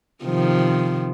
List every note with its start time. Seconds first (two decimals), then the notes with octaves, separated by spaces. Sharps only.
0.24 C3 D#3 F3